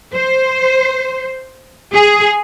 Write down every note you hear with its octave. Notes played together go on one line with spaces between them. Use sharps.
C5
G#4